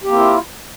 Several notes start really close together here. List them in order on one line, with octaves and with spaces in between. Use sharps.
G4 A#3 C4 E4 F4